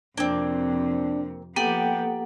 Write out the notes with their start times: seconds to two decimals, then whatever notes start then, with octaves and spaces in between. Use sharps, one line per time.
0.17 F2 C3 A#3 C4 D4
1.56 F3 A#3 B3 G4 A4 F#5 G5